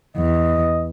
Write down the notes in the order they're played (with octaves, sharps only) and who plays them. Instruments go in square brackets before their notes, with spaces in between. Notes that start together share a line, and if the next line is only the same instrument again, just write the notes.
[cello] E2 [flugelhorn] D#5